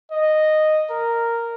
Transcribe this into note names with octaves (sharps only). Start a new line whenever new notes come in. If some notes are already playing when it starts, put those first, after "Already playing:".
D#5
A#4